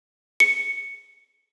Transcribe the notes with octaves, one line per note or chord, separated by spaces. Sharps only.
C#7